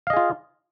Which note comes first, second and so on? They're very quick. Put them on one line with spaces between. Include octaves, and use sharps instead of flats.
F5 D#5 G#4 F4